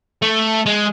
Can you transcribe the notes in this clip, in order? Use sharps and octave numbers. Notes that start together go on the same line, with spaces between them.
A3
G#3